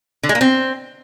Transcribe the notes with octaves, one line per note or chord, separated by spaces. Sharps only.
D3
G#3
A#3
C4